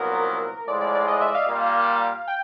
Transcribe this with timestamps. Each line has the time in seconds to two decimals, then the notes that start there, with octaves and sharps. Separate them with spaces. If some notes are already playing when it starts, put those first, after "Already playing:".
Already playing: C2 A#2 F#3 B3 A#4
0.67 A2 F3 G#3 D5
0.81 D5
0.95 D5
1.08 D#5
1.21 E5
1.35 F5
1.47 A#2 G3 A#3
2.28 G5